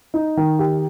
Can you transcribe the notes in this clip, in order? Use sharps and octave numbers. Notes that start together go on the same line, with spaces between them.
D#4
D#3
G4